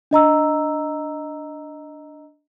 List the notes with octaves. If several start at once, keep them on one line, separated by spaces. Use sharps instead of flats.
D4 D#5 A#5 E6